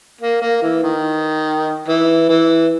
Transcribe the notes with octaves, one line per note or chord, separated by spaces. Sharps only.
A#3
A#3
E3
D#3
E3
E3